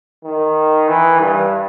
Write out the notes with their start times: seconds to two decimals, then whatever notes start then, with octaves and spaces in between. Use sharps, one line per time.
0.24 D#3
0.88 E3
1.20 G2